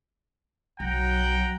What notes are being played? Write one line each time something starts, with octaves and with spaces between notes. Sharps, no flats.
B1 F#3 F#5 G5 A#5